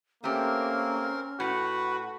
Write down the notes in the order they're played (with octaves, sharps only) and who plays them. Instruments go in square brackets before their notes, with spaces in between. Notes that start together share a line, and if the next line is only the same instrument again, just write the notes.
[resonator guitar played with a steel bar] A3 G4 [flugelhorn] A#3 [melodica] C4 A#4 [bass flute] C#4
[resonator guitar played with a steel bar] A2 [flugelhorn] F#4 [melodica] B4 B5